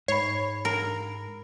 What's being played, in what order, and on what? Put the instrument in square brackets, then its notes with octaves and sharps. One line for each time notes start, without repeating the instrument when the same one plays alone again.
[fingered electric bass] G#2 [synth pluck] C#5 [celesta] B5 C7
[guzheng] A#4